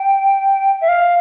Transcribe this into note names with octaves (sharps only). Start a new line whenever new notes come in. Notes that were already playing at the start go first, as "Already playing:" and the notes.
Already playing: G5
E5
F5